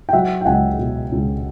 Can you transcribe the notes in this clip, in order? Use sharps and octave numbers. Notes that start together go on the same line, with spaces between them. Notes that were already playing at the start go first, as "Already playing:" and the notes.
G5
F#3 E5 F#5
G5
C#2 F#5 G#5
B2
C#2